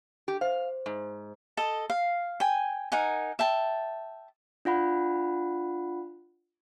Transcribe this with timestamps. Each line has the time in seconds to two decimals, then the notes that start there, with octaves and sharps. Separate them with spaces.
0.28 G4
0.41 C5 F5
0.86 G#2
1.57 A4 D#5 A5
1.90 F5
2.40 G5 G#5
2.92 D#4 A#4 F#5 G#5
3.39 E5 G5 A5
4.65 D4 F4 F#5 B5